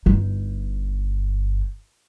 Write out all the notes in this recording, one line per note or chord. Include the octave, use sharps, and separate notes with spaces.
G1 D#4